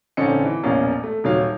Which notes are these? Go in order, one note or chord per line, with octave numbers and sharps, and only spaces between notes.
A#1 D3 C4 C#4 D#4 C#7
E3
E1 A#1 B2 A#3 C#4 F5
A3
D#1 D#3 F#3 C#5 F5